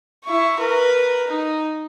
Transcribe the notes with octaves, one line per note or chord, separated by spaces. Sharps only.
E4 C#6
A#4 B4
D#4